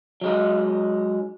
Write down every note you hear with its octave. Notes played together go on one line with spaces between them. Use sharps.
F#3 G#3 D#4